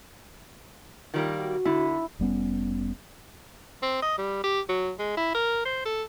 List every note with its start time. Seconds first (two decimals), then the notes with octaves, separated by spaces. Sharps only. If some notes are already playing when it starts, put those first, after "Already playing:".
1.14 D#3 G3 A#3 F4
1.39 F#4
1.65 D3 E4
2.19 F1 G3 B3 C#4
3.82 C4
4.02 D#5
4.18 G3
4.44 G4
4.69 F#3
4.99 G#3
5.17 E4
5.35 A#4
5.65 C5
5.85 A4